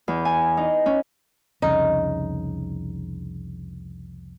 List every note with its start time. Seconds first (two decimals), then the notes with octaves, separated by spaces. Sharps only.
0.08 E2
0.25 G#5
0.57 D#4
0.86 C#4
1.62 C2 F2 C#3 D#4